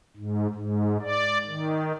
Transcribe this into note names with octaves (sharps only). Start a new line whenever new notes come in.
G#2
G#2
D5
D#3